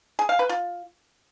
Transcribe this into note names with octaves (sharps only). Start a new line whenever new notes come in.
G#4
F5
B4
F4